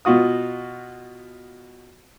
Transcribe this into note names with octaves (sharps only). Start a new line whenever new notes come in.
B2 F4 F#4 D#6